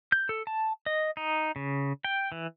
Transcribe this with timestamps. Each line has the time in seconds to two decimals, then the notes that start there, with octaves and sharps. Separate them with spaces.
0.12 G6
0.29 A4
0.47 A5
0.86 D#5
1.17 D#4
1.56 C#3
2.05 G5
2.32 E3